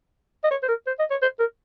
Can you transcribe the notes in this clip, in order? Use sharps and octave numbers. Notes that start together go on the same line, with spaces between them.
D#5
C#5
C5
A#4
C5
D#5
C#5
C5
A#4